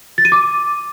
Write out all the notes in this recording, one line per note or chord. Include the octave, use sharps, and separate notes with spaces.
A6
D#7
D6